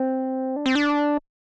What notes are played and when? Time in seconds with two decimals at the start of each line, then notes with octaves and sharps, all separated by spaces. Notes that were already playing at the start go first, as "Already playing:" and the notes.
Already playing: C4
0.56 D4
0.66 C4
0.75 D4